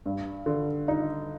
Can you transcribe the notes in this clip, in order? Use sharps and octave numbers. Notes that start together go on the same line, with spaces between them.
G2
D3
D#4